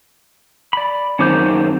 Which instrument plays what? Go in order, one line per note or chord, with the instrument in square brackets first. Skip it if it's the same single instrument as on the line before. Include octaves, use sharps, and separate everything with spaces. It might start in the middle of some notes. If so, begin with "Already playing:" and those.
[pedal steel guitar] D5 B5
[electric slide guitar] F#2 D#3 C4 [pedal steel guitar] C#4 D6 G6